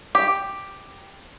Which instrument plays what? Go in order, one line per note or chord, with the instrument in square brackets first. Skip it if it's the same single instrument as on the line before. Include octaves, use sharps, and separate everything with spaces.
[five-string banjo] G4